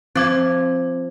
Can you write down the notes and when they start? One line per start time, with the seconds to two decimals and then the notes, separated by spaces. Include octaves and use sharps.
0.15 F3 C4 D6 G#6